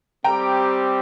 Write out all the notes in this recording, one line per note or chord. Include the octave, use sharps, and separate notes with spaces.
G3 C4 G4 G5 A#5